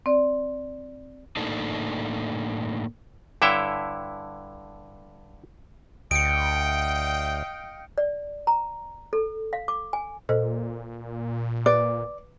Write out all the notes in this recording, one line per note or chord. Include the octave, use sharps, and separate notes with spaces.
C4 D5
A2 A#3 D4 D#4 A4
G2 D3 E4 C#5 E5 G5
D2 D#5 F5 G5 C#7 D7
D5
A#5
A4
F5
D6
G#5
A#2 A4 C5 D#5
B4 D5